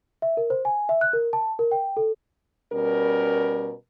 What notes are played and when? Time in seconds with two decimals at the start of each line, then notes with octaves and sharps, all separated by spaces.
0.22 E5
0.37 A#4
0.50 C5
0.65 G#5
0.89 E5
1.01 F#6
1.13 A#4
1.33 A5
1.59 A#4
1.72 G5
1.97 A4
2.73 B2 G3 C#4 A#4